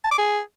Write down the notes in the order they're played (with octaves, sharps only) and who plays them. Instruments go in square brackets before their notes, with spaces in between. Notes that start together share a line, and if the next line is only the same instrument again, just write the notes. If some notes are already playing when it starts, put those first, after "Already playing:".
[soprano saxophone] A5
D6
G#4